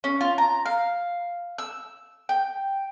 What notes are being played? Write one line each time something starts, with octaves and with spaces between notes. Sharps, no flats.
C#4
F4
A#5
F5
E6
G5